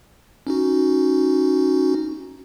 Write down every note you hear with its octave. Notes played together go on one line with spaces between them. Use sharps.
C#4 D#4 F#4